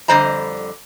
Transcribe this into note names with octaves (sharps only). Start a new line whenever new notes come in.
F2 D3 G3 C5 D#5 A#5